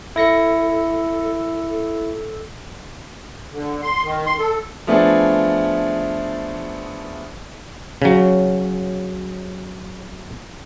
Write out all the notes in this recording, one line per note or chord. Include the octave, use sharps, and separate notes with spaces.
E4 A4 A#6 C#7
D3
C6
D#3
C6
A4
F3 A3 B3 D4 G#4
C#3 F#3